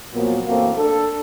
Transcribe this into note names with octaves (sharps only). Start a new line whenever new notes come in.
A#2 F3 F#3 A#3 B3
F#2 E3 A3 A#3 C4
D4 A4